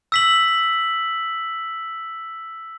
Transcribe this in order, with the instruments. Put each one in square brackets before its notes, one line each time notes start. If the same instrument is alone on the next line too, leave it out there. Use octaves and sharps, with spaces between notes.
[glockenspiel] E6 B6 F#7